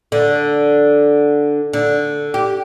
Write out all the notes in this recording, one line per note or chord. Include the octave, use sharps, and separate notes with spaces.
D3
D3
G4